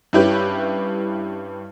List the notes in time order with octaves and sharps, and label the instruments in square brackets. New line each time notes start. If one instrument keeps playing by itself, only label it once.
[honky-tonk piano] G2 C#4 E4 G4 B4